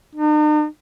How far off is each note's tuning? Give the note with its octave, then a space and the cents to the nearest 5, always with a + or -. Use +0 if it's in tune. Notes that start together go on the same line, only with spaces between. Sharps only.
D#4 -45